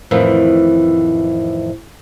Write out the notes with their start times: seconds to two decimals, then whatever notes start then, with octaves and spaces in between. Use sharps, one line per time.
0.11 F2 A2 D#3 E3